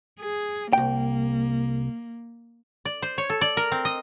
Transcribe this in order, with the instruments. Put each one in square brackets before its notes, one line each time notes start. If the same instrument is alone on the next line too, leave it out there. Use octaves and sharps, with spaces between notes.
[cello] G#4
[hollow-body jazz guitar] C2 G5 [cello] A#3
[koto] D5
C5
C#5
A4
D5
A#4
C4
D#5